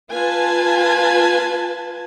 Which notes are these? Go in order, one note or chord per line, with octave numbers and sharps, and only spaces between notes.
F4 B4 G#5 A5